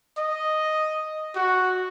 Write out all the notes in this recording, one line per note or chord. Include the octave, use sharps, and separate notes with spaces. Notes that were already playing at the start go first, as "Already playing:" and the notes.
D#5
F#4